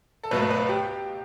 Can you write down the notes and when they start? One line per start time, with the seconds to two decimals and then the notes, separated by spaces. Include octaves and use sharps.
0.23 A4
0.31 C#2 B2 F#3 A3 B4
0.51 B4
0.69 G4